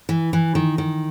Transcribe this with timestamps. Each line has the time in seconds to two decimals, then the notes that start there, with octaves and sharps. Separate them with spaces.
0.09 E3
0.33 E3
0.55 D#3
0.78 D#3